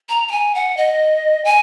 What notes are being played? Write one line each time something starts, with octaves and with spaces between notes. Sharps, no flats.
A#5
A#5
G#5
F#5
D#5
G#5